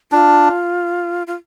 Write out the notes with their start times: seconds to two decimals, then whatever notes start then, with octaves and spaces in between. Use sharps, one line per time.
0.12 D4 F4
1.27 F4